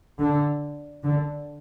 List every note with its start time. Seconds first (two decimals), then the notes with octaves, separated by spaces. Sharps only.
0.19 D3
1.03 D3